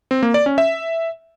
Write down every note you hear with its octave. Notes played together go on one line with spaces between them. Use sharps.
C4
A#3
D5
C#4
E5